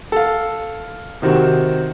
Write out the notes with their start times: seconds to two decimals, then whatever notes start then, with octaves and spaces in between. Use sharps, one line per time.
0.12 A4 F5
1.22 C3 D#3 C4 F#4